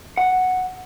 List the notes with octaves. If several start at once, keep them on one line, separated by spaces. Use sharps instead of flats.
F#5